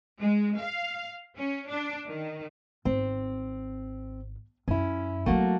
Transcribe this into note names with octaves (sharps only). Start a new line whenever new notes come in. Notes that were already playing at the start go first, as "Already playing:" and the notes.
G#3
F5
C#4
D4
D#3
G#1 C4
F#2 C#4 E4
F#3 A3 A#3 C4 F#4